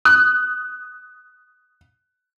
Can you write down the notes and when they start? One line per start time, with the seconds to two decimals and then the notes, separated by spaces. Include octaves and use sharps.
0.05 D#6 F#6